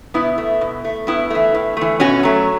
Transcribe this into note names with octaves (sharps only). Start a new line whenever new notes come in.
B2 B3 E4
A3
B2
A3
A2 B3 E4
E3 A3
A2
E3 A3
B2 C#4 F#4
F#3 A3